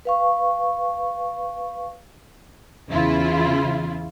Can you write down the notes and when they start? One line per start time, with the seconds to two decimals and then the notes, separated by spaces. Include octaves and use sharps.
0.05 B4 F5 C#6
2.88 E2 C#3 E3 E4 F4